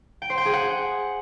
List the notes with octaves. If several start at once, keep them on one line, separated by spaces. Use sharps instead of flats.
G5
C5
G5
G#4
F#5